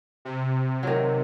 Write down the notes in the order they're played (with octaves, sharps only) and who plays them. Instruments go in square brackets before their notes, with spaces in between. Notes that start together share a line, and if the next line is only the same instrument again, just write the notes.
[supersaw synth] C3
[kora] D#3 F#3